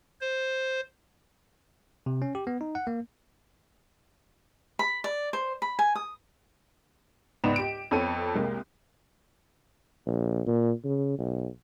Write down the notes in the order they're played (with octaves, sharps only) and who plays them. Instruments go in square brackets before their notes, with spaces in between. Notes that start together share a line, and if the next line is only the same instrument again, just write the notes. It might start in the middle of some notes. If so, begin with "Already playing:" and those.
[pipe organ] C5
[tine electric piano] C3
C#4
G4
B3
D#4
F#5
A#3
[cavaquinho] B5
D5
C5
B5
G#5
D#6
[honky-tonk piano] C#2 G#2 B3 D5 B5 E7
G4 D7
F2 B3 C4 A4 C#5 D#7
C2 G#3 A#3
[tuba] A#1
A#2
C#3
B1